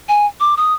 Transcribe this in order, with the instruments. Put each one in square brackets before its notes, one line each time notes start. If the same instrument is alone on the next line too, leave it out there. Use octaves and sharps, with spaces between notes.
[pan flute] G#5
D6
D#6